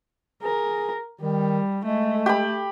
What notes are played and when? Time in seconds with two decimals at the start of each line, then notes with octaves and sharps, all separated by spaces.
0.43 G#4 A#4
1.21 D#3 G3
1.85 G#3 A3
2.26 G4 B5